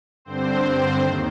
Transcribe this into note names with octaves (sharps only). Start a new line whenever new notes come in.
G2 D3 C4 C5
D#2 D#3